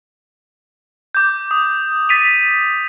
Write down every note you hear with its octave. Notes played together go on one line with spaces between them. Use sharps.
D6 G6
D#6
A6 B6 D#7 F7